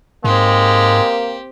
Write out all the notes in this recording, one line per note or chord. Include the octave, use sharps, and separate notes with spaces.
G#2 G#3 A#3 C4 G4